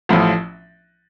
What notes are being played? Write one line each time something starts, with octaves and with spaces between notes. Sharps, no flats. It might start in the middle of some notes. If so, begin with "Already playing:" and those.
A1 A2 F3